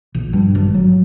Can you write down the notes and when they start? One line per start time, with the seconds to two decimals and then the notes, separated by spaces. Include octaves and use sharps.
0.14 A#1
0.33 G2
0.55 G#1
0.74 F#3